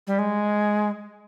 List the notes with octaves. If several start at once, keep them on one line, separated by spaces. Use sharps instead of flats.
G3
G#3